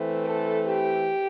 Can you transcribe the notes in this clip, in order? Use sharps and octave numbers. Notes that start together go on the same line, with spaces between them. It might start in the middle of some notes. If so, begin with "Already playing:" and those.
Already playing: E3 A3 C4
A4
G4